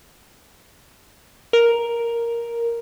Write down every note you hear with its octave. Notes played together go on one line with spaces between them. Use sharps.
A#4